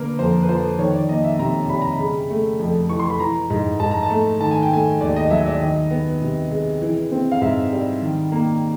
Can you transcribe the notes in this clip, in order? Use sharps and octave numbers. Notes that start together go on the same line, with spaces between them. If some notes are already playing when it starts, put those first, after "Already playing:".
Already playing: D3 A#3 A#4 B4
F2 C5
B4
F3 C5
D#3 C#5
D5
A#3 D#5
E5
C3 A#5
G3 B5
A#5
B5
C#3
A3
F2
E3 C#6
C6
B5
E3 A#5
G#2
G#2 A5
A#5
A5
A3
D#3 A5
G#5
G5
A3 G#5
D#2 D5
D#5
F#3 E5
D5
D#3 D#5
B3
C3
G#3
E3
C4
F5
G#2 E5
G3
D#3
A#3